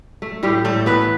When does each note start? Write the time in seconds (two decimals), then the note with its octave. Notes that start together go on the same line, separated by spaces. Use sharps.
0.22 A3
0.43 A2 G3 G4
0.65 A2 A3 A4
0.86 E3 B3 B4